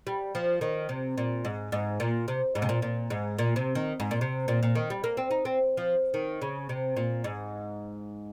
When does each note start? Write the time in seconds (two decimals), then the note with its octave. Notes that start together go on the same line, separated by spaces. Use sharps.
0.07 G3
0.35 F3
0.61 D#3
0.89 C3
1.18 A#2
1.45 G#2
1.72 G#2
2.00 A#2
2.28 C3
2.55 G#2
2.62 C3
2.69 A#2
2.82 A#2
3.10 G#2
3.38 A#2
3.56 C3
3.75 D#3
4.00 G#2
4.11 A#2
4.21 C3
4.48 A#2
4.63 A#2
4.75 D#3
4.90 G3
5.04 A#3
5.17 C4
5.31 D#4
5.45 C4
5.77 F3
6.14 D#3
6.42 C#3
6.69 C3
6.97 A#2
7.24 G#2